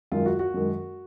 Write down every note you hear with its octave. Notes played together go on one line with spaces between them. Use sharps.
F#2 D#3 G#3 F4
F#4
F#4
F#2 D#3 G#3